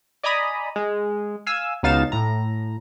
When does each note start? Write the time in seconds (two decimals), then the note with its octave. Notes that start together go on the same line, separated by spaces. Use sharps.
0.23 D5 D#5 G#5 A#5 B5 D#6
0.76 G#3
1.46 F5 G#5 E6
1.83 C#2 B2 D#4 F5 A6 E7
2.12 A2 A#5